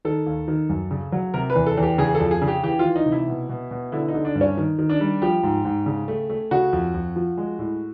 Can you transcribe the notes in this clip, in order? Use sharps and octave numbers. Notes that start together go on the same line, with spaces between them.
D#3 A4
D#2
D#3
F#2
C#3
F#3
C3 A#4
B4
E2
A4
E2
G4
C#3 G#4
A4
F2
G#4
C#3
G4
E3 G4
F4
E3
D#4
C3
E4
B2
B2
B2
D3 E4
D#4
D3
D4
G2
C#4
D#3
D#3
D4
G3
F3 G4
G#2
G#2
C#3
A3
A3
C#3 F#4
F2
F2
F3
G#3
A2